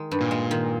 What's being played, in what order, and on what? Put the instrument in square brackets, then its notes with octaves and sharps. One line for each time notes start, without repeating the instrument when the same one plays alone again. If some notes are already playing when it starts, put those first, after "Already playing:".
Already playing: [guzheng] D#3 G#3
G2
[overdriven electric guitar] A#2
[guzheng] G#3
D#3